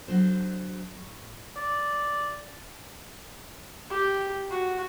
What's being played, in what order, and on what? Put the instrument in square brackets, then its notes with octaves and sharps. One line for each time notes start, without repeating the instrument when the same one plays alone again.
[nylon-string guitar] F#3 D4 A4 C5
A2
[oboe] D5
[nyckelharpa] G4
F#4